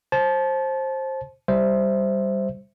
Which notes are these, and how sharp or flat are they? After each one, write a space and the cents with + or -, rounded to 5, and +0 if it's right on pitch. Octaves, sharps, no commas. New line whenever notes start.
C5 +20 A5 -25
G3 +0 C5 +0 E5 +0